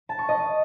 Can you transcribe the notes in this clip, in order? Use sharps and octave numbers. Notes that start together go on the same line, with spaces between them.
A5
C#6
D#5